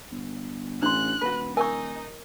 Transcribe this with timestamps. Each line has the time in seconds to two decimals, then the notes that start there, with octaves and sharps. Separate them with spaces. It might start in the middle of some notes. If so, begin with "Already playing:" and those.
0.12 G1
0.83 A1 D4 C6 F#6
1.21 D#1 F#4 B4
1.57 D#4 A#4 G#5 C#6